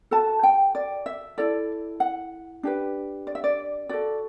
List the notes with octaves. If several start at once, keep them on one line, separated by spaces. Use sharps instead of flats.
F#4 A4 A5
G5
D5
E5
E4 A4 D5
F#5
D4 G4 B4
D5
E5
D5
F#4 A4 D5